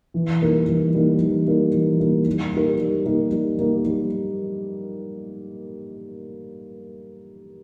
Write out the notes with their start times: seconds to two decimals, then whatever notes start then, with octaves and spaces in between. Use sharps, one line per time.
0.14 E3
0.41 G3 A#3 D#4 A#4
0.68 E3
0.94 G3 A#3 D#4 A#4
1.21 E3
1.47 G3 A#3 D#4 A#4
1.74 E3
2.00 G3 A#3 D#4 A#4
2.27 G3
2.53 A#3 D#4 G4 A#4
2.80 G3
3.06 A#3 D#4 G4 A#4
3.32 G3
3.59 A#3 D#4 G4 A#4
3.85 G3